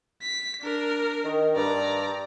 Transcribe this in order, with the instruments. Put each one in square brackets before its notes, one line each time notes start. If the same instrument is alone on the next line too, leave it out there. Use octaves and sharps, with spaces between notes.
[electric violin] B6
D4 A#4
[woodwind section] D#3
[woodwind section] G2 [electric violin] D5 A#5